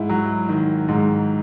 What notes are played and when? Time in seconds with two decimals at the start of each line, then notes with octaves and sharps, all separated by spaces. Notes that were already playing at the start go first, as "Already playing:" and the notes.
Already playing: G#2 E4
0.09 F#3
0.49 D#3
0.88 G#2